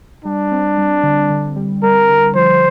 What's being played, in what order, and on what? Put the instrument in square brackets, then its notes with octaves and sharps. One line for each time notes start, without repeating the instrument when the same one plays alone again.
[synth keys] G3 [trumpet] D4
[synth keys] C4
G3
D3
D3
G3
[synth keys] G3 [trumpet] A#4
[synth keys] D3
[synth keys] F3 [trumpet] C5